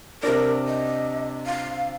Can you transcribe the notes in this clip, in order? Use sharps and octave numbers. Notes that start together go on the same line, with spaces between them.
C3 D4 A#4
D#5
F5